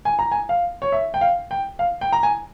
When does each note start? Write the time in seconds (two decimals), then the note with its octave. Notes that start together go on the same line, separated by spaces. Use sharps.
0.05 G#5
0.19 A#5
0.32 G#5
0.49 F5
0.82 C#5
0.92 E5
1.14 G5
1.21 F5
1.51 G5
1.79 F5
2.01 G5
2.12 A#5
2.23 G#5